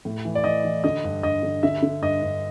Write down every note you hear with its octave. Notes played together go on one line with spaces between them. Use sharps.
A2
E3
D5
E3 D#5
E3
D3 D#5
G2
G2 D#5
D3
D3 E5
D3
G2 D#5
G2